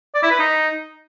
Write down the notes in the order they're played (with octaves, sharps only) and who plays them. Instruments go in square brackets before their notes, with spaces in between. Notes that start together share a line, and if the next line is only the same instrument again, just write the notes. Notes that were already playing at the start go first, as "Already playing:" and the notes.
[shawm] D5
E4
B4
D#4